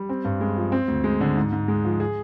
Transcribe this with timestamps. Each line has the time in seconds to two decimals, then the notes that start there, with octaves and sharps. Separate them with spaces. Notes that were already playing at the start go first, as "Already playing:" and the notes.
Already playing: G3
0.09 C4
0.25 G2
0.41 G#3
0.57 F3
0.72 C4
0.88 D2
1.04 G#3
1.21 D3
1.37 G#2
1.52 G#2
1.68 G#3
1.85 F3
2.00 G#4